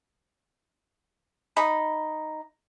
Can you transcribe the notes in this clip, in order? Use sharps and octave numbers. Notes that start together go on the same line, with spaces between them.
D#4 B5 D#6